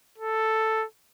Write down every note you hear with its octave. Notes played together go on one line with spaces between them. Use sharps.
A4